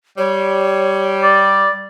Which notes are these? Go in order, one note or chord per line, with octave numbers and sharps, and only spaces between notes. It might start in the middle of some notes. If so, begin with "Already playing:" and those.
G3 C#5
D5